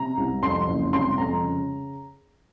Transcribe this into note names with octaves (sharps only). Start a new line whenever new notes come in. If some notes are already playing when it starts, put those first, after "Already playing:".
Already playing: C3 A#5
C2
F2 C6
F#1
C3 C6
F2 A#5
C#3